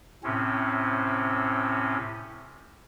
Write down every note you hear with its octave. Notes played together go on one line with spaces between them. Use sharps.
A2 C3 C4 C#4